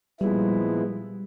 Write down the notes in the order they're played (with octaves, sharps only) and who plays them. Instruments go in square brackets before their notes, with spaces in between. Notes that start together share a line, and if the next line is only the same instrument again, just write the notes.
[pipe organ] A#2 F3 G#3 B3 E4 [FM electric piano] G3